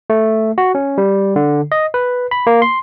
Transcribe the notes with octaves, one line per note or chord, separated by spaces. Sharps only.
A3
F#4
C#4
G3
D3
D#5
B4
B5
A#3
C6